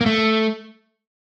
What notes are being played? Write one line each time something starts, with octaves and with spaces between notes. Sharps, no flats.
A#3
A3